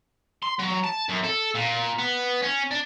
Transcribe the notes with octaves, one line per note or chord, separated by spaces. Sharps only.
C6
F#3
A5
F#2
A4
A#2
B3
C#4
D4